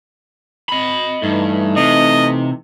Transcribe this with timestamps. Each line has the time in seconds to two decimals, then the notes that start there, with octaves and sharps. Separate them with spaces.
0.69 D#5 B5
1.23 G2 E3 A3 D#4
1.76 C3 D#5